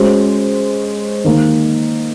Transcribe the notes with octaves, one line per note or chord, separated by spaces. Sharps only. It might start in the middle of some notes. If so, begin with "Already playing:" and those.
Already playing: G#3 C#4 F#4 C5
D#3 A#3 D#4